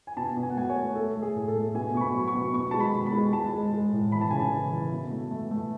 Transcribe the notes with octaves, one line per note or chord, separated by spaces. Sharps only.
G#5
B2 A5
B2
G#5
F#5
A3 G#5
C#5
A3
A3 A4
A3
G#4
A2
A4
A3
B2 G#5
B2 C#6
B5
F#3
C#6
B2
B2 C#6
G#3 A5
B5
B2
B5
G#3
G#3 A5
G#3
G#3
A2
E3 B5
A5
C#3 G#5
A5
E3
E3
B2
A3
A3
A3